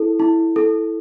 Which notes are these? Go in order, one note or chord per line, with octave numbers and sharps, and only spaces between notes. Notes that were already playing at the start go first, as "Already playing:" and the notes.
Already playing: E4 A4
E4
A4